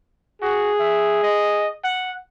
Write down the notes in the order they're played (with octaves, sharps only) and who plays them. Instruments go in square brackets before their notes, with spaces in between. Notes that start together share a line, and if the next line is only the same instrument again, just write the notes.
[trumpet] F#4 [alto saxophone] G#4
[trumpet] E5
D#5
F#5